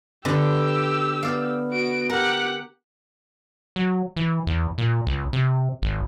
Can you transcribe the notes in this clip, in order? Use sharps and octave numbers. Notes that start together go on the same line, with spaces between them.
D3 B3 G4 E6
B3 D5 F5
F#4 D7
G4 A#4 F#5
F#3
E3
E2
A#2
C#2
C3
G#1